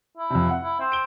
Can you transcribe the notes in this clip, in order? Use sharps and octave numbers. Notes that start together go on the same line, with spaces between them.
E4
F2 C3
F#5
E4
C4
D7 G7